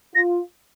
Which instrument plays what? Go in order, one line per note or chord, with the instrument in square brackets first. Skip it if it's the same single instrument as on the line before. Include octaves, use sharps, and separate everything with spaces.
[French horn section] F4 [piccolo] A#6